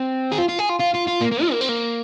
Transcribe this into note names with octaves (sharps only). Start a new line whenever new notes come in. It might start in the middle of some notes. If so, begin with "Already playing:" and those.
Already playing: C4
G#4
F4
F4
G#4
F4
F4
F4
F4
A#3
A#3
F4
A#3
C4
A#3